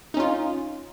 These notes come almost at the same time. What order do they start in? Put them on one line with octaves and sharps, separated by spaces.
D#4 C#4 F4